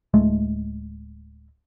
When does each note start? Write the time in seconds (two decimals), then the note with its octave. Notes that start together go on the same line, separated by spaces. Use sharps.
0.14 D1 G#3 A3